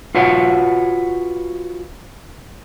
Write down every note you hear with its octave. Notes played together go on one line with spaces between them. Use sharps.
F4 F#4 B4 C#5 F#5